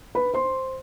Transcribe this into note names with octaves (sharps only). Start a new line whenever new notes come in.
B4 B5
C5 C6